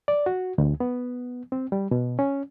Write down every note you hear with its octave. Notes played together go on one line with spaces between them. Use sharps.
D5
F#4
D2
B3
C4
G3
B2
C#4